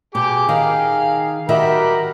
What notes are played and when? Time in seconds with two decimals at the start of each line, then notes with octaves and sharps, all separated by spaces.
0.15 B2 G4 G#4 D6
0.49 D#3 F5
1.49 D#3 F#4 G4 A#4 E5 B5